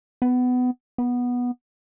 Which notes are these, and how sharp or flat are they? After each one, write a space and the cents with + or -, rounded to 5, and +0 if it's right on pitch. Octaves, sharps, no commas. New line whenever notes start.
B3 +20
B3 -10